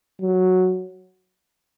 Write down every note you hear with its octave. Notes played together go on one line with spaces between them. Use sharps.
F#3